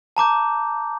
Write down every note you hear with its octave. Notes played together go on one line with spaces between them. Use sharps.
A5 A#5 D6 G6